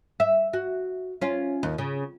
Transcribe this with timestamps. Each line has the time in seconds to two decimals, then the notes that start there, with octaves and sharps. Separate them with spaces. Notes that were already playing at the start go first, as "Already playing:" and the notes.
0.20 E5
0.53 F#4
1.22 C#4 F4
1.63 D#2
1.78 C#3